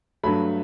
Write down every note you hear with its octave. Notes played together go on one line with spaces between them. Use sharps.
G2 F#3 A3 B5